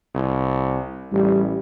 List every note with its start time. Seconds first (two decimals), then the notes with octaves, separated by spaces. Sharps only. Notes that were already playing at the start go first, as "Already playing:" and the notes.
0.15 C2
1.12 A1 G3